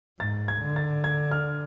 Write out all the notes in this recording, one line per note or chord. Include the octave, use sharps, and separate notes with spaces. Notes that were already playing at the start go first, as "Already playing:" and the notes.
G#2 A6
G#6
D3
A6
G#6
F6